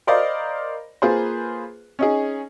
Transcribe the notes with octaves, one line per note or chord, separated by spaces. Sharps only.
A#4 C5 D5 D#5 F5 B5
A#3 F4 G#4 B4 C5
C#4 D#4 G#4